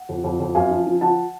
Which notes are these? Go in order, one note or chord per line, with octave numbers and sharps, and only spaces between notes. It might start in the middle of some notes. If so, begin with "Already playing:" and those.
Already playing: F#5
F2
F2
F2
F#2 F5 G#5
F3
F3
F3 F#5 A5